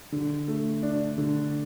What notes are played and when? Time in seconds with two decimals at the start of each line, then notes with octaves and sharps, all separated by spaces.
0.12 D3
0.48 A3
0.83 D4
1.18 D3